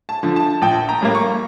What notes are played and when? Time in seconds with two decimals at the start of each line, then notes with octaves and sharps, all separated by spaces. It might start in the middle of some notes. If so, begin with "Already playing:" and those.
0.09 A5
0.23 D3 F3
0.36 A5
0.62 A#1 G5
0.89 A#5
1.01 A2 G3 A#3
1.15 C#6